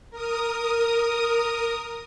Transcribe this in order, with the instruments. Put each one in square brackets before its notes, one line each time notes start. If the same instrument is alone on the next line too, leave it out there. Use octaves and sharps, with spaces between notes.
[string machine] A#4 D#6